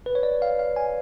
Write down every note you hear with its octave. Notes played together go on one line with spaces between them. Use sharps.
B4
C#5
D5
F5
F5
G#5